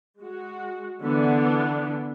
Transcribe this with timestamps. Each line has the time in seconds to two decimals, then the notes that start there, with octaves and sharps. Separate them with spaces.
0.19 G#3 F#4
1.00 D3 E3 B3 D4